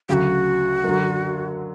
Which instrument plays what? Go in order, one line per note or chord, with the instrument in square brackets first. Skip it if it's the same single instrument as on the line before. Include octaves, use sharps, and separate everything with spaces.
[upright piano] D2 C#3 F#3 [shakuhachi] F#4 G4
[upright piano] F#2 D3 F#3